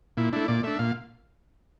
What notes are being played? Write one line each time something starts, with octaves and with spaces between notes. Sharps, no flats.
A#2 E4
A3 D4 E4
A#2 D5
A3 D4 E5
A#2 F5